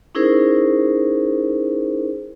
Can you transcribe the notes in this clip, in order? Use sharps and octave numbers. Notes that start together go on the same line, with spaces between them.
C#4 D#4 E4 G#4 A#4 C5